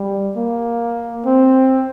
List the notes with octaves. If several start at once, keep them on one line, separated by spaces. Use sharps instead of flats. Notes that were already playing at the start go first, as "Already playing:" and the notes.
Already playing: G3
A#3
C4